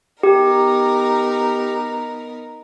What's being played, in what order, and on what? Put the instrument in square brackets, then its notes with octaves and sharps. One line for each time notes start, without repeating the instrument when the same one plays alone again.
[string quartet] B3 D#4 A#4 [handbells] G4